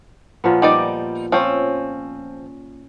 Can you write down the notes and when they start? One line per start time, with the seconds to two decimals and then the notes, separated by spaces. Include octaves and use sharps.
0.44 A#2 F3 B3
0.62 G3 D#4 D5
1.32 F3 C4 C#4